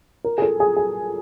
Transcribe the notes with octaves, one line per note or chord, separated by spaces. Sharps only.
A#4
G#4
A4
G#4
G#4